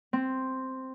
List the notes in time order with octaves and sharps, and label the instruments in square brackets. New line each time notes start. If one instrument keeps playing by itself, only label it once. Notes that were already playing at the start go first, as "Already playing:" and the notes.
[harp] C4